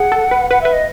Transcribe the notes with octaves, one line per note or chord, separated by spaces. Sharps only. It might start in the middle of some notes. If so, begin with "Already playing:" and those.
Already playing: G#4 F#5
A4
B4
B4 F#5
B4 E5
D#5